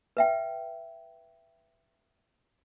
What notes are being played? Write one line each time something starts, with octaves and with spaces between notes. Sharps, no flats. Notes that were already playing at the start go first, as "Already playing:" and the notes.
B4 E5 G5